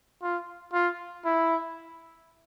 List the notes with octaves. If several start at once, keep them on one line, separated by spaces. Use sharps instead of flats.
F4
F4
E4